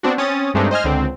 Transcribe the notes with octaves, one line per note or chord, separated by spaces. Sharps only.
B3 C4 D4 F#4
C4 C#4 D#6 A6
G2 G#3 A3 C4 D4 D#4
C5 D#5 G#5 F6
C#2 D3 C4